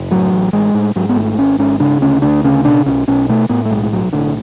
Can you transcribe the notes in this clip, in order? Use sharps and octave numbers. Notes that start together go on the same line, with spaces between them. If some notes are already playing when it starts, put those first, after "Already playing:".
Already playing: F#1
A2 F#3
A1
A1 G#3
A2
G#2 F#3
B3
G#1 A3
G#1 C#4
G#2 C#4
C#3 D4
D2 C#4
D2 D4
C#3 C#4
B2 D4
B1 C#4
B1 C#4
B2 A3
A2 B3
A3
B1 G#3
B1 F#3
A2 D3